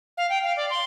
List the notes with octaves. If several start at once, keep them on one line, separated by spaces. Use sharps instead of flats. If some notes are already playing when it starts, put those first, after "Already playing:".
F5
G5
F5
D5
C6